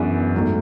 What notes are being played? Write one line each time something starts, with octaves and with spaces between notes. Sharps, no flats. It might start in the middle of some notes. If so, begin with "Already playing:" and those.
Already playing: F#2 E3 B3 D4 G#4
G#2 F#3 A3